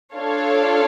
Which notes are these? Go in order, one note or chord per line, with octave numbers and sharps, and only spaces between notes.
D4 F4 A4 C#5 F5